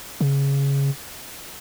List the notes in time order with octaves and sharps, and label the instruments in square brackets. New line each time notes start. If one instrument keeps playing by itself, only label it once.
[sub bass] C#3